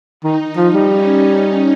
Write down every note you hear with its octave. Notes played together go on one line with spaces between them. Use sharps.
D#3 D#4
F3
G3
C#4